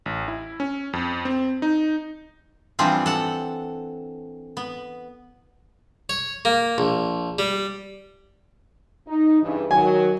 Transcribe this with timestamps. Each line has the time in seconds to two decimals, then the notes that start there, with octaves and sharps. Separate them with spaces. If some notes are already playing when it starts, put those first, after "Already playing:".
0.06 A1
0.28 E4
0.60 C#4
0.93 F2
1.25 C4
1.62 D#4
2.79 E3 F3 G3 C4 D4 F4
3.06 A4 F#5
4.57 B3
6.09 C#5
6.45 A#3
6.78 A#1
7.39 G3
9.08 D#4
9.42 G2 C#3 E3
9.71 D#3 F#3 G#5